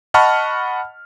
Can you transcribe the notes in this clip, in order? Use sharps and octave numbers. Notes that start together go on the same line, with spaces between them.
D#5 F#5 A5 B5 C#6 F6